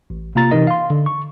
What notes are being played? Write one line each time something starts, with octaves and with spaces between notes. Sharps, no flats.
A1
C3 A#3 F4 A#5 A6
C3 E3 D#4 A#4 D#5
F5 C6
D3
C#6